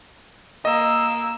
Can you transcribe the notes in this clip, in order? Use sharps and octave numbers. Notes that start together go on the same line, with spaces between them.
A#3 D#5 E6